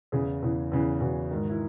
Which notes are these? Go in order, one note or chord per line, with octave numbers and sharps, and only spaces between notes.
E2 C#3 E3 G#4
E2 C#3 E3
E2 C#3 E3
E2 C#3 E3 F#4
G#2 D#3
E4